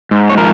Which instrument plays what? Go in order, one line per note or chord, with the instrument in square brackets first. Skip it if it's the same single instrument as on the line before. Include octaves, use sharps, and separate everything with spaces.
[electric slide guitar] G#2
C#5
F3 A#4